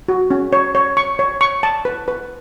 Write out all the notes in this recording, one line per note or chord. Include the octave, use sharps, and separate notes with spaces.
F#4
C#4
C#5
C#5
C#6
C#5
C#6
A5
B4
B4